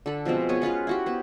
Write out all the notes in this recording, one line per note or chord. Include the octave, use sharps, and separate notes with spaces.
D3 A4 B5
B2 F3 G#3 C4
G#3 B3 G#4 C#5
C#4 F4 B4 F5
E4 F#4 G4
B3 C5